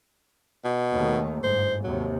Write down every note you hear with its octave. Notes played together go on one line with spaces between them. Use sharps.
B2
D#2 D#3 A3
G1 G#2 C5
D#2 C3 F#3